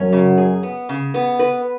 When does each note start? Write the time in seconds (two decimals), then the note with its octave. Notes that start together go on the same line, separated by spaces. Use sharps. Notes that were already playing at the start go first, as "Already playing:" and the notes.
Already playing: F#2 F#3 C#4
0.12 C#3
0.37 G#4
0.63 B3
0.89 C#3
1.14 B3
1.39 B4